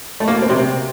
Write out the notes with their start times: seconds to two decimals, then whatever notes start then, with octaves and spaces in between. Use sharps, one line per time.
0.20 A3
0.28 A#3
0.35 B2
0.42 C4
0.49 C3